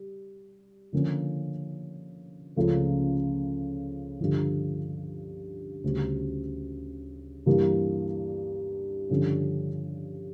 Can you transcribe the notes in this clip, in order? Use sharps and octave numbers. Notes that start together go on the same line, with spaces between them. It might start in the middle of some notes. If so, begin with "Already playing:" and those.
Already playing: G3
D3 F3 A#3 C#4
C#2 C#3 F3 A3
G2 D3 F3
D2 C#3 G3
G2 E3 G3 A#3
G2 D3 F3 C#4